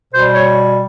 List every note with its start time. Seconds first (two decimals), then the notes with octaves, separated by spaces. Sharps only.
0.13 B2 G3 C5
0.35 C#5